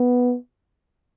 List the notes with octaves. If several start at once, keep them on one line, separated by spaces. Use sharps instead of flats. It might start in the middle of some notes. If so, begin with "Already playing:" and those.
Already playing: B3